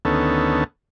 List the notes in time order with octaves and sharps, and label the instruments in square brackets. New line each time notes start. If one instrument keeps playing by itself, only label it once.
[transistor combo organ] D2 D#3 B3 C#4 A4